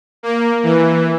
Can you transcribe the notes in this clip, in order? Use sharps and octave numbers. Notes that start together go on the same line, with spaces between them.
A#3
E3